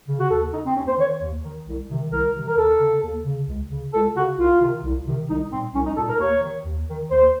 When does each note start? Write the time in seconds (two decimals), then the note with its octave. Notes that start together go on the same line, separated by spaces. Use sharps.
0.08 C#3
0.20 F#4
0.30 D#2 A4
0.53 C#3 D#4
0.66 C4
0.76 D#2 C#4
0.87 C5
0.99 D#3 C#5
1.22 D#2
1.44 D#3
1.67 C2
1.90 C3 D#3
2.12 C2 A#4
2.35 C3 D#3
2.48 A#4
2.57 D#2 A4
2.80 C#3
3.03 D#2
3.25 C#3
3.48 C#2
3.71 C#3
3.93 C#2 A4
4.16 C#3 F#4
4.38 C2 F4
4.61 C3 D#3
4.84 C2
5.07 C3 D#3
5.29 C2 D#4
5.52 A#2 C4
5.74 C2 C#4
5.86 D#4
5.97 A#2 A4
6.09 A#4
6.19 D#2 C#5
6.43 D#3
6.65 D#2
6.88 D#3
7.11 D#2 C5